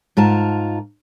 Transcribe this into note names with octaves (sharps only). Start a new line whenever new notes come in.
G#2 F4 A#4 A5